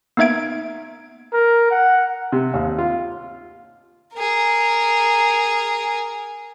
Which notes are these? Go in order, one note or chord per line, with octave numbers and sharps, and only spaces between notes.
A#3 B3 D#4 E5 G#6 D7
A#4
F#5
C3
D#2
F4
G#4 A#4